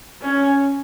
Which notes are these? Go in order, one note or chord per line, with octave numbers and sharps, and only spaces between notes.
C#4